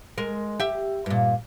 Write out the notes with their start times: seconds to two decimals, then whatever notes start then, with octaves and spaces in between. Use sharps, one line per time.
0.18 G#3 A#4
0.60 G4 E5
1.06 G2 A#2